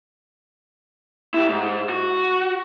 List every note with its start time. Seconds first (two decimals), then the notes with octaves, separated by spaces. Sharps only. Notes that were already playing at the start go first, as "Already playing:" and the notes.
1.34 E4 G4
1.49 G#2
1.89 F#4